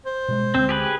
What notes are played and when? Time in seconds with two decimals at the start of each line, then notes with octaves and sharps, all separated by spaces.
0.05 C5
0.28 B2 G3 G#3
0.55 D2 G#3 C4
0.69 G4 G#4 B4